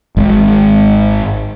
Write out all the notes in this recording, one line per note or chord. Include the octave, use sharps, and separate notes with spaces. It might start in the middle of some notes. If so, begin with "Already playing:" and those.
G#1 G#2